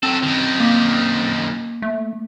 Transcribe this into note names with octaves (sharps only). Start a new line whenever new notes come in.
F#3 C4 A4
F#2 D#3
A#3 D6 B6
A3